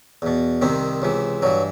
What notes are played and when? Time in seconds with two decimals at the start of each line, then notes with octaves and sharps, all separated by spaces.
0.22 E2 B2
0.62 C2 C3 D#3 C4
1.02 C#2 C3 E3
1.42 G2 E3 F#3